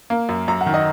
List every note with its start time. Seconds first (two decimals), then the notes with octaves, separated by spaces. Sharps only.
0.10 A#3
0.29 F#2
0.48 F#2 A#5
0.61 F#5
0.66 D#3
0.74 D#5